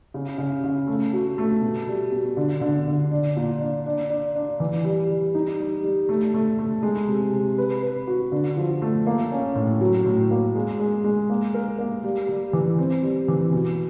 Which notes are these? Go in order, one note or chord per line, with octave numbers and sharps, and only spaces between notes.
C#3
C#3
C#3
A3
F#4
A3
B2
G3
B2
D3
D3
D3
D4
A#2
D4
D4
D4
D4
E3
G3
G3
D#4
G3
G3
A3
A3
A3
G#3
C3
C3
B4
B4
F#4
D3
F3
A3
A#3
C#4
A2
F#3
A2
A#3
G#3
G#3
G#3
A#3
A#4
A#3
G3
G3
E3
C4
G3
E3
B2